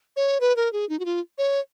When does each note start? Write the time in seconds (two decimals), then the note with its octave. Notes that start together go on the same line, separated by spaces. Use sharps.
0.16 C#5
0.40 B4
0.56 A#4
0.73 G#4
0.89 D#4
0.99 F#4
1.05 F4
1.38 C#5